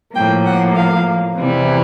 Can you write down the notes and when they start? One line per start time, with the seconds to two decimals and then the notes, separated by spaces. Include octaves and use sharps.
0.15 A2 F3 A#3 G5
0.45 F#5
0.76 F5
1.37 E2 C3 E3 G3